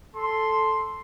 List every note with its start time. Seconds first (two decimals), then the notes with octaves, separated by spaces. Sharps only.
0.15 A4 C6